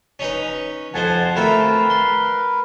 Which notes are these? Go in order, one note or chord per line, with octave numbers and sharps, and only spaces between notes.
C#4 D#4 B4
F2 F3 C5 F#5 G#5 A5
A3 C4 F4 A#4 B4
C6